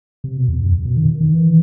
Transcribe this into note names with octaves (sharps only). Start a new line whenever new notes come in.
C3
B2
E2
F#2
B2
D#3
D#3
E3